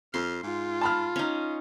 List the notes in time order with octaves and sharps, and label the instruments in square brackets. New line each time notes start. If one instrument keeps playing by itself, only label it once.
[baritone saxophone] F2 [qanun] C6 [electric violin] F6
[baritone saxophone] G#2 [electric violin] F4
[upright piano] A5 B5 F6
[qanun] C#4 D#4